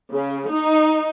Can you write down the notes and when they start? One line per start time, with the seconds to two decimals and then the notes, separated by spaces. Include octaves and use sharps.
0.12 C#3
0.51 D#4